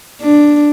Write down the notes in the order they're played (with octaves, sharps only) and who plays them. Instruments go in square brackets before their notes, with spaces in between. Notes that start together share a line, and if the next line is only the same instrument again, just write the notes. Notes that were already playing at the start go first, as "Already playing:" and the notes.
[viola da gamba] D4